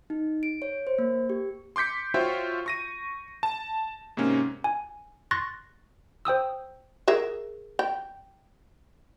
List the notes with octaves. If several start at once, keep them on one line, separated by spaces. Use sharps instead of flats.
D#4
D7
C#5
C5
A#3
G4
C6 D6 G6 B6 C#7
F4 F#4 C5 C#5 E5 G5
C#6 A#6 D#7
A5
G#2 C3 A#3 C#4
G#5
C6 C#6 F#6 A6 A#6
C5 G5 D#6 E6
G#4 A#4 E5
G5